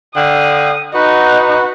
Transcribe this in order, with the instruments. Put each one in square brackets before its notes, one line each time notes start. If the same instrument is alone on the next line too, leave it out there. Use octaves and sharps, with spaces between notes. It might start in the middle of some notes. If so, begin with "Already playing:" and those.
[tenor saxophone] D3 [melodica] F5 G5 [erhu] D#6
[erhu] D#4 [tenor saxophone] F#4 [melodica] B4 F#5